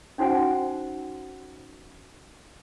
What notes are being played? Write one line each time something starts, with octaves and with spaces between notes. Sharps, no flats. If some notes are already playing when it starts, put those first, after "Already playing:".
C#4 D#4 F#4 C5 F#5 G#5